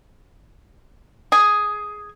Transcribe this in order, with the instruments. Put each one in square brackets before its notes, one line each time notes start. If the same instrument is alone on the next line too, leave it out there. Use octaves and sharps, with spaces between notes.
[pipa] G#4